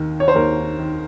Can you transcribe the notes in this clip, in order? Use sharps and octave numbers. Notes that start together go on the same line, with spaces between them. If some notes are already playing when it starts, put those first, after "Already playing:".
Already playing: D#2 D#3
C#5
C5
D#2 A#4
D#3